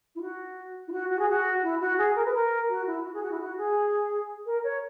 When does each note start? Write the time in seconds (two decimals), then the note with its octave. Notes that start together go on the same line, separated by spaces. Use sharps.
0.15 E4
0.21 F#4
0.87 E4
0.92 F#4
1.10 F#4
1.19 G#4
1.29 F#4
1.63 E4
1.80 F#4
1.98 G#4
2.15 A#4
2.25 B4
2.34 A#4
2.69 F#4
2.87 E4
3.04 F#4
3.14 G#4
3.22 F#4
3.31 E4
3.40 F#4
3.57 G#4
4.46 A#4
4.64 C#5